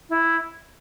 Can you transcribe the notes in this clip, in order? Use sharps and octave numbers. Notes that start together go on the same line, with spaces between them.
E4